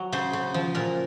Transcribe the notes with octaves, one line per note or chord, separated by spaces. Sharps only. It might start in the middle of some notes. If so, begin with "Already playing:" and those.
Already playing: F#3
C#3 C5
C#3
F3
A#2 A#4